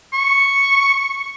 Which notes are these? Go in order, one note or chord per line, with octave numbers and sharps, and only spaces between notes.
C#6